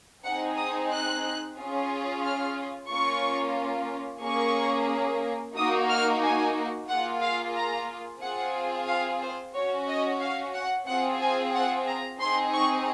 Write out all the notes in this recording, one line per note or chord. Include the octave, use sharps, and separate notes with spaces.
C4 D#4 G#4 F#5
D#6
F#6
C#4 F4 G#4
F6
A#3 C#4 F4 C#6
A#3 C#4 G#4 C#6
A#3 D#4 F#4 D#6
F6
G#5
A#3 F4 G#4 F#5
F5
A#5
C4 F4 G#4 F#5
F5
C5
C#4 F#4 C#5
D#5
F5
F#5
C4 F4 G#4 F#5
G#5
F#5
A#5
C4 D#4 G#4 C6
C#6